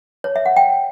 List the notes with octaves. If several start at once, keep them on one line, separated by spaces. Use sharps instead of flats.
C#5
E5
F#5
G5